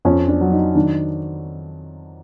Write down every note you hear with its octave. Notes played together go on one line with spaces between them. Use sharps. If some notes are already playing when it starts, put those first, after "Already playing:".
F2 C#4
D4
F#3
D#4
D#3 D4